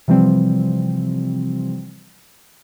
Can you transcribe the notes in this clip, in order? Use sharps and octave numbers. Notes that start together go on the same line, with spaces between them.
C3 E3 F3 G3 C4